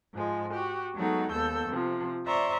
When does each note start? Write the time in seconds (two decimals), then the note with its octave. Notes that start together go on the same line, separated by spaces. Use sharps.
0.14 G#2 F3 G#3
0.53 F#4 G4
0.96 F#3 G#3 A3 B3 D#4 F#4
1.31 D#2 B3 A4 E6 G6
1.68 C3 F3
2.26 C5 D5 E5 A#5 C6 C#6